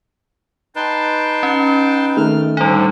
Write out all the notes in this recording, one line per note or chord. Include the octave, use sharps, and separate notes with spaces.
D#4 B4 G5 A5 C6
C#4
D#3 A3 F6
A2 D3 G3 D#4